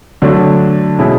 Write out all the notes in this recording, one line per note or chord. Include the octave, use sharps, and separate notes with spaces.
D3 F#3 A3 D4
B2 G#3 C#4 E4